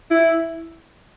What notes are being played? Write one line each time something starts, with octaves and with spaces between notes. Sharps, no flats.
E4